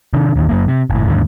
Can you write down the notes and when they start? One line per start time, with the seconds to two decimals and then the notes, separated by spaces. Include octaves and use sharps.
0.13 C3 D#3 D4
0.36 A1 D#2 D#3
0.49 F#2 F#3 A#3
0.68 C3
0.90 F#1 A2
1.08 D#2 G#2 D3